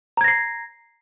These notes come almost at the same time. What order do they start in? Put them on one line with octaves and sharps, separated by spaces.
A#5 G#6 A#6 C7